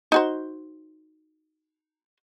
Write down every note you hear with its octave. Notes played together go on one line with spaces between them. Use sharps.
D#4 F#4 C5